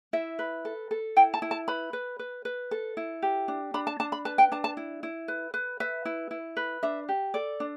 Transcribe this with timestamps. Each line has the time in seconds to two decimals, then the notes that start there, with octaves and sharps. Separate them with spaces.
0.13 E4 E5
0.39 B4
0.65 A4
0.91 A4
1.17 E4 G5
1.34 A5
1.42 E4
1.51 A5
1.68 B4 B5
1.93 B4
2.19 B4
2.45 B4
2.71 A4
2.97 E4
3.22 G4
3.48 D4
3.74 D4 B5
3.87 A5
4.00 D4 A5
4.12 B5
4.25 B4 A5
4.38 G5
4.52 D4 A5
4.64 A5
4.77 E4
5.03 E4
5.28 B4
5.54 B4
5.80 B4 E5
6.05 E4
6.31 E4
6.57 B4
6.83 D4 E5
7.09 G4
7.34 A4 D5
7.60 D4